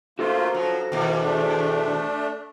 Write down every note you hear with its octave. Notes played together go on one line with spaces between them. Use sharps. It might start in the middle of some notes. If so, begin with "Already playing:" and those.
A3 A#3 F4 F#4 A4 C5
F3 F#3
D#2 G#2 B2 A#3
A3 D4